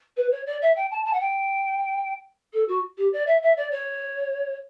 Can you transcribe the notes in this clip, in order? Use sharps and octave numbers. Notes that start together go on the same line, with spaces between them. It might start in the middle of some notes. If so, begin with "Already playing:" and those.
B4
C#5
D5
E5
G5
A5
A5
F#5
G5
A4
F#4
G4
D5
E5
E5
D5
C#5